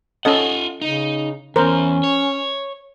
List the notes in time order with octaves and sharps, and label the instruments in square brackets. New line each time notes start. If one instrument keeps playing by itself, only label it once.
[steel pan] C#4 A4 D#5 [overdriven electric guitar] F4 F#5
[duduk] C#3 [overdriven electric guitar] D#4
[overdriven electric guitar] E2 E3 [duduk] C#4 [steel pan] A#4 C5
[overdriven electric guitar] C#5